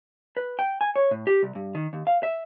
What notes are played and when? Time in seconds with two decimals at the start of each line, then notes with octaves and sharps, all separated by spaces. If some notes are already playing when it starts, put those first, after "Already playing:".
0.37 B4
0.59 G5
0.81 G#5
0.96 C#5
1.11 A2
1.27 G4
1.43 C2
1.55 G2
1.75 D#3
1.93 D#2
2.07 F5
2.23 E5